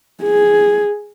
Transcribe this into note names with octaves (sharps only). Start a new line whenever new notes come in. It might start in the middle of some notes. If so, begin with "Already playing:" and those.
G#4